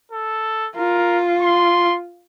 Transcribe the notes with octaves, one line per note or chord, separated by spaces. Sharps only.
A4
F4 A#4
C6